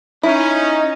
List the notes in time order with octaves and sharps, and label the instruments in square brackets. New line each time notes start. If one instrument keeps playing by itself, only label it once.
[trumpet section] C#4 [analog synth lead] D#4 [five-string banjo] E4